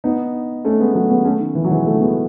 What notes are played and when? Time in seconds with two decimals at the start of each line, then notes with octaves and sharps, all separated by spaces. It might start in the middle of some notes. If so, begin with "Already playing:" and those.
0.04 B3 D#4
0.64 A3 C#4
0.80 G#3 B3
0.94 F#3 A3
1.10 G#3 B3
1.25 A3 C#4
1.40 D#3
1.55 E3
1.64 F#3
1.71 E3 G#3
1.86 F#3 A3
2.01 G#3 B3